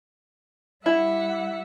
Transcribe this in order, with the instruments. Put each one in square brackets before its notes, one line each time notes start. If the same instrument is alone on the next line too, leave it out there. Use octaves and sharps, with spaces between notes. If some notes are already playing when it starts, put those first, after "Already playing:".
[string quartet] G3 E5 F#5 [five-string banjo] E4